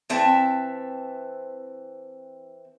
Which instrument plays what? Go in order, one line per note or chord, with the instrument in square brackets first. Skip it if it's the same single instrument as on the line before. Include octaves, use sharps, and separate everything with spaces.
[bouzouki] E3 C4 E5 A5